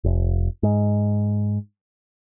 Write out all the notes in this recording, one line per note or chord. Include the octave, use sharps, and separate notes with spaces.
F1
G#2